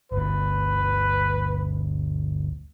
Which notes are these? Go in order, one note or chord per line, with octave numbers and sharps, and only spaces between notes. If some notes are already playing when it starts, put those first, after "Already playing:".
G1 D2 B4